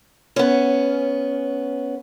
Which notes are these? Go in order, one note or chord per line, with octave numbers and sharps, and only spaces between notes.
B3 C#4